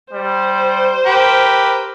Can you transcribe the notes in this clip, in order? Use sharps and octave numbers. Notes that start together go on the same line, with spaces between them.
G3 C5
G4 A#4 B4